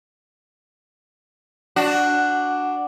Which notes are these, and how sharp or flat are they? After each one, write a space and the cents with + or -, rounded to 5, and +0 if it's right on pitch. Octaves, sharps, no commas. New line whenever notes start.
D4 +0 F#4 +0